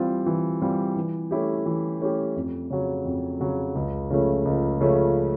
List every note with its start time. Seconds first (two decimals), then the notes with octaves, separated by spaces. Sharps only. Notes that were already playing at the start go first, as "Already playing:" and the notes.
Already playing: E3 G3 C4 F4
0.26 E3
0.61 G3 C4 F4
0.96 E3
1.31 A3 C#4 E4 G4
1.66 E3
2.01 A3 C#4 E4 G4
2.36 F2
2.70 C#3 F#3
3.05 F2
3.40 C#3 F#3
3.75 C#2
4.10 C#3 F3 A3 C#4
4.45 C#2
4.80 C#3 F3 A3 C#4